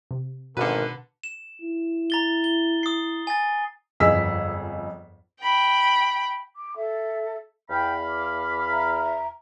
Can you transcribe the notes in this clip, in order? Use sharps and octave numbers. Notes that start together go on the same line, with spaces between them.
C3
G#1 B2 D3 A#4 B4
E7
E4
A#5 A6 G7
G7
D#6 C7
G#5 A6
G1 F2 G#4 D#5 E6 B6
G5 B5
D6
A4 E5
E2 F5 G5 A5 B5 G6
D6
E5 A#5